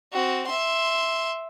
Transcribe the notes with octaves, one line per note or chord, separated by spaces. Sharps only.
C4 F#4
E5 C6